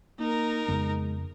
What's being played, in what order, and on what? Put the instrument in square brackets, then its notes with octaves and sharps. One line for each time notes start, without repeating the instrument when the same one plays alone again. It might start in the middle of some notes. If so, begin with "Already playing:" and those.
[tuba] A#3 [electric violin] D#4 A#4
[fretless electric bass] F2 C#3 B3 [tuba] G#3